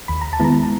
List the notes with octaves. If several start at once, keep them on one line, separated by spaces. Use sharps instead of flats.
D#2 B5
A#5
A5
D#3 G#3 B3 E4 A#5